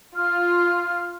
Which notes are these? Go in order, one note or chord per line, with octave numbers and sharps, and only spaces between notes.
F4 F6